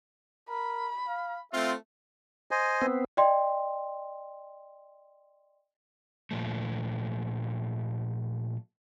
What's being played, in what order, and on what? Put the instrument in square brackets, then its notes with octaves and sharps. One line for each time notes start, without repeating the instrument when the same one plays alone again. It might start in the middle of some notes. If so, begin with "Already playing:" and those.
[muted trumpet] A#4 [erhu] B5
[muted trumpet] F5
[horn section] A3 C4 F4 [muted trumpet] E5
[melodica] C5 D#5 G#5
[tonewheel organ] B3 C4
[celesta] D5 D#5 G5 C6
[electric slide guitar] A#2 F3 A3